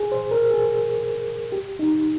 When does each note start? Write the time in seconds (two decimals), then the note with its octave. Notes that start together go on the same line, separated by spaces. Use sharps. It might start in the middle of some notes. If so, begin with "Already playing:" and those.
Already playing: G#4
0.12 C5
0.31 A#4
0.51 G#4
1.52 G4
1.79 D#4